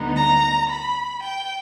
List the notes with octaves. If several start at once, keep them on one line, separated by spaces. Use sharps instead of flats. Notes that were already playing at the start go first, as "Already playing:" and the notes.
Already playing: D2 D3 G3 B3 D#4
A#5
B5
G5